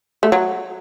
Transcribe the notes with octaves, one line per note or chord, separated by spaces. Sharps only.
A3
F#3